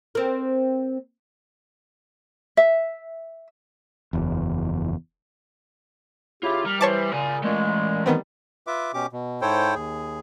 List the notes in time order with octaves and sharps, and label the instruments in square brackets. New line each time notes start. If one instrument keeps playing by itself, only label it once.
[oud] C4 A#4
[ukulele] E5
[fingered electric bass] F#1 E2
[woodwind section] C#3 E4 G4 [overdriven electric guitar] F4
[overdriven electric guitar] G3 [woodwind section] A#4 F6
[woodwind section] E3 C5 [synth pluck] C#5 A5 D6
[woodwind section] A#2 C#3 [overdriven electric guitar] A#4 G#5
[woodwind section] A#2 G#3 [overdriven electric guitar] E3 A3
[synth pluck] D#3 B3 C4 [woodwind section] G3
[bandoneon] F4 B4 E5 D6
B2 C#4 G4 D6
B2
G#2 E4 A4 C5 C#5 G5
D#2 G#4